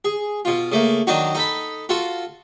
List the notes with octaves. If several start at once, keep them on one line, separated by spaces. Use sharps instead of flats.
G#4
B2 F4
C#3 A3 A#3
D#3 F#3 D4 D#4 F#4
D#4 A4 B5
F4 F#4 A4